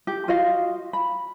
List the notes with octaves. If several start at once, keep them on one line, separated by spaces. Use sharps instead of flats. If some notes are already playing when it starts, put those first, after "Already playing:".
G4
F4 F#4 D#5 F5
B5